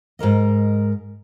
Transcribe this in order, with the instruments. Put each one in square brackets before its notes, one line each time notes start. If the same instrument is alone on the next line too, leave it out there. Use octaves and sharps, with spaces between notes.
[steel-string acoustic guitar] G#2 D#3 A#4 D#5